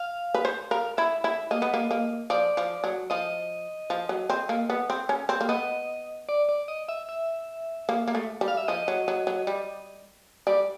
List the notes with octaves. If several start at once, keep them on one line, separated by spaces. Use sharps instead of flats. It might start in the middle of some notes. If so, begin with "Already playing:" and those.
Already playing: F5
B4
C5
A#4 F5
E4 E5
E4 E5
A#3 D#5
B3
A#3
A#3
F3 D5
F3
F#3
F3 D#5
F3
F#3
C4
A#3
B3
C4
C#4
C4
A#3
B3 D#5
D5
D5
D#5
E5
E5
A#3
A#3
A3
G3
F5
E5
F3 D#5
F#3
F#3
F#3
G3
G3 D5